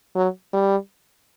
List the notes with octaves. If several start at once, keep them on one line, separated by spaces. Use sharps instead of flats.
F#3
G3